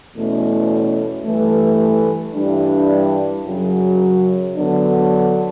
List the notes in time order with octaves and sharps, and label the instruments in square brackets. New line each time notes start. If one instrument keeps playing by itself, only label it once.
[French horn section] E2 B2 A3 C#4
G2 E3 A3
G2 E3 G3 D4
F#2 C#3 F#3
D3 F#3 B3 D4